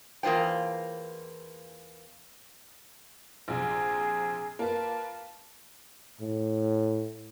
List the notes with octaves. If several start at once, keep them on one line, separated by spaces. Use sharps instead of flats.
E2 A#3 F4 C5 G5
A#1 C3 G#4
A#3 F4 B4 A5
A2